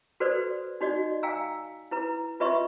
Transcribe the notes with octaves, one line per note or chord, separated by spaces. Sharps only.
F#4 A4 B4 C5 D5
D#4 F#4 D5 D#5
F5 G5 G#5 A#5 E6
E4 B4 A#5
F4 B4 D#5 E5 C6 C#6